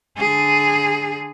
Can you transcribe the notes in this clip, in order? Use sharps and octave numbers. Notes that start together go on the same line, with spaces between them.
D3 G#4